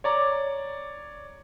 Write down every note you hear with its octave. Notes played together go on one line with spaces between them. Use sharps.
C#5 D5 A#5 D6